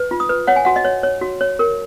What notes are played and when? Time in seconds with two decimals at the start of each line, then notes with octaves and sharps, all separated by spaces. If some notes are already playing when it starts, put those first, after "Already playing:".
Already playing: B4
0.11 F4
0.20 D#6
0.29 B4
0.47 C#5 F#5
0.56 G#5
0.65 F#4 F#5
0.76 D#5
0.85 C#5
1.03 C#5
1.21 F#4
1.41 C#5
1.59 A#4